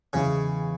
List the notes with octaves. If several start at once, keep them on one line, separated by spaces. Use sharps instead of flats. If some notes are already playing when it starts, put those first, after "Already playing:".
E2 C#3 E3 G#3 E4